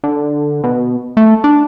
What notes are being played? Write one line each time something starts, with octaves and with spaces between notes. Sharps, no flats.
D3
B2
A3
D4